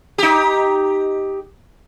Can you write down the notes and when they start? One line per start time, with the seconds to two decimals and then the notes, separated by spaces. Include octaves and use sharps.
0.18 D#4 G4